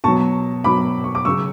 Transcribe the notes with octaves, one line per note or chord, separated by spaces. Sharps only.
B2 F#3 A5 C#6
B2 F#3 B5 D6
C#6
D6
C#3 F#3 C#6 E6